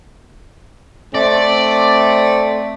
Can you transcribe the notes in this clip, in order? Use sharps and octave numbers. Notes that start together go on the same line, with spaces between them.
A3 C4 D5